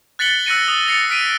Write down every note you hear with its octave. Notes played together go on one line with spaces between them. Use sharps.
F#6 A6 B6 C#7 F#7 G7
E6 F#6 A6 A#6 C#7 D#7
D#6 C#7
A6 A#6 C7 C#7
F6 B6 D7 D#7